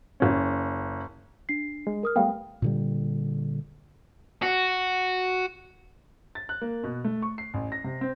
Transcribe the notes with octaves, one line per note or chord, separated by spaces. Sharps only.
F#1 C#4
D4 C7
G#3
A#4 D#6 F6
G3 A3 B3 B4 F5 G5
A#2 D3 G3
F#4
A6
F#6
A#3
B2
A3
C#6
C7
A1
A#6
C3
C4